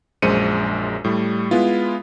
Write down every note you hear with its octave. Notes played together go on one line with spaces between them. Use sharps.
A#1 F#2 G#3 C5 C#7 D#7
A2 G3 A3
G#3 B3 E4 F4